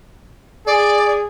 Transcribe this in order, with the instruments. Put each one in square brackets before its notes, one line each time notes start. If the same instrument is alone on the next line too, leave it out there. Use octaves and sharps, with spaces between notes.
[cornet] G#4 [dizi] D5